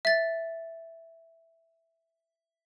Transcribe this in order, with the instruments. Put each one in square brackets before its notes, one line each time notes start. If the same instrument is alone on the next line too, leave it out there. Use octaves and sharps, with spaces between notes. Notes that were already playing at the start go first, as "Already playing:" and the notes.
[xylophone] E5 A6